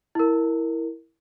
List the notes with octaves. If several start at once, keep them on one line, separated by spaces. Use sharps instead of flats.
E4 A#4